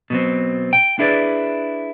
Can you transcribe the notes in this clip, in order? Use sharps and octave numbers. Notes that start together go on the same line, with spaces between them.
B2 F#3 C4
G5
D4 E4 G#4 B4 D5